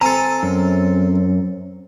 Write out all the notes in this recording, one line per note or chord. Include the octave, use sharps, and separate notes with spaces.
C4 A4 G#5 A#5
F#2